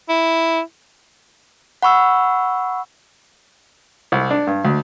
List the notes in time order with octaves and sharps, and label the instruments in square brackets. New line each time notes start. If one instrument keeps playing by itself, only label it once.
[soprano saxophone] E4
[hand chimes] F#5 B5 C#6 E6
[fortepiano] C2
D4
G2
D2